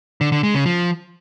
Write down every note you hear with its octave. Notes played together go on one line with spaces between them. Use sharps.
D3
D3
G#3
C#3
F3